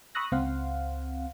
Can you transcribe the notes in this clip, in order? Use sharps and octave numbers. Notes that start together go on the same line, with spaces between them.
B5 C#6 D#6 E6 F#6 A#6
C#2 C4 C5 F5 F#5